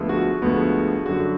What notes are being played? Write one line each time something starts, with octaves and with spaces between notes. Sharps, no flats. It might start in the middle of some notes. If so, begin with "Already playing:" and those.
Already playing: D2 D3 F3 G#3 B3
F#4
D2 D3 F3 G#3 B3
F#2 D3 G3 F#4